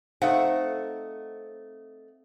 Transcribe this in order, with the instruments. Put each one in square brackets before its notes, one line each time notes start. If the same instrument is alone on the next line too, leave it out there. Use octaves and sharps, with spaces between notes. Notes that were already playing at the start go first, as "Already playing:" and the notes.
[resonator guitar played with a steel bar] A3 D#4 F#5 [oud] C4 [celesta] F5